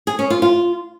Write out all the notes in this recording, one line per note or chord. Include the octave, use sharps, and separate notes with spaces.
G#4
C#4
F4
F4